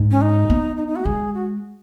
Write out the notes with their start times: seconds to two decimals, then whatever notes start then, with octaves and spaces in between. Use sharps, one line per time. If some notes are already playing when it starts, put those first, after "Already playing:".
Already playing: G#2
0.11 C#4
0.21 D#4
0.50 B3
0.77 D#4
0.87 D#4
0.96 F#4
1.05 G#3 G#4
1.34 F#4